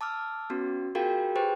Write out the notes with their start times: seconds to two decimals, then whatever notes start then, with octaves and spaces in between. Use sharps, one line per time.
0.01 A5 D6 E6 F6
0.50 B3 C#4 F#4
0.95 F4 F#4 G#4 A#4 F5 G5
1.36 G4 G#4 B4 C5 G5